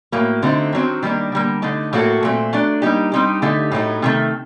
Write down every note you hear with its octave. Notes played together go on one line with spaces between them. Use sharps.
A2 F#3 A#3
D3 A3 C4 D#4
D#3 F#3 C4
D#3 G3 A#3 D4
D3 G3 A#3
D3 A3 D#4
A2 F#3 A#3 F#4 A4
A#2 A3 C4
F#3 A3 D4
G3 A#3 D#4 G4
G3 C4 D#4 G4
D3 A3 D#4 G4
A2 F#3 A3 D#4
C3 D#3 A3